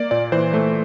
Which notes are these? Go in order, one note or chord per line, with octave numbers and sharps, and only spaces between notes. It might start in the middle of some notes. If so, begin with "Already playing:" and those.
Already playing: A#3 D5
A#2 D5
E3 C5
A3